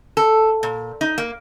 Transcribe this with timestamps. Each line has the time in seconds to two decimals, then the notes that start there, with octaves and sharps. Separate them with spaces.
0.17 A4
0.63 A#2
1.01 D#4
1.18 A#3